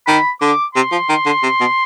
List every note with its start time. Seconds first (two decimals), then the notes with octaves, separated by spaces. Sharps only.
0.07 D#3 B5
0.41 D3 D6
0.75 C3 C6
0.92 F3
1.09 D#3
1.26 D3
1.43 C3
1.60 B2